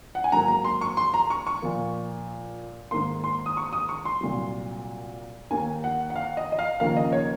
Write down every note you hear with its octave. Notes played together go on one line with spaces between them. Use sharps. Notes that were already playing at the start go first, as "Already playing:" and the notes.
F#5
G#5
G#2 F#3 A#3 A#5
A#5
C6
C#6
C6
A#5
C#6
C#6
A#2 F3 A#3
G#2 D#3 A#3 C6
C6
D#6
C#6
D#6
C#6
C6
C2 A#2 F#3
D#2 D#3 A#3 G#5
F#5
F#5
F5
D#5
D#5
F5
D#2 C#3 F3 A#3 F5
D#5
C#5